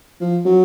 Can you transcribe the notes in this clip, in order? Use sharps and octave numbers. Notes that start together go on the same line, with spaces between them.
F3
F#3